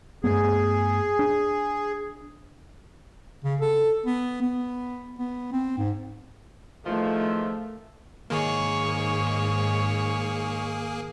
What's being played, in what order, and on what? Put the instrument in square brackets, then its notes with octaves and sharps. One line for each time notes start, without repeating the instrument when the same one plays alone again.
[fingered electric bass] G2 A3 B3 [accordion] G#4
[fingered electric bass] D4
[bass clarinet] C#3
A4
B3
B3
B3
C4
G#2
[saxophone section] E2 D#3 F3 [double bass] A3
[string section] G#2 [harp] D#3 [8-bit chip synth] A#3 G#4 [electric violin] C#5 C#6